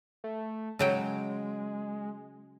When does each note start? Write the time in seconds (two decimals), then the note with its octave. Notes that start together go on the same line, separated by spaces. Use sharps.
0.24 A3
0.79 C#3 F#3 G#3 G5